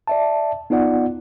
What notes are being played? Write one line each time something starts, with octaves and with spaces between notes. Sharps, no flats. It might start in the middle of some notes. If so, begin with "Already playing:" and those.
D5 E5 A5
B3 D#4 F4 D5 F#5